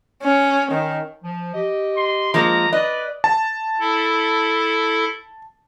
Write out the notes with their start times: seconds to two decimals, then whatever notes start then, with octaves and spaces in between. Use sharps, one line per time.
0.23 C#4
0.72 D#3
1.24 F3
1.54 G4 D#5
1.97 C6
2.34 F3 G#3 A#3 A#5
2.73 B4 D5 D#5
3.24 A5
3.80 E4 A4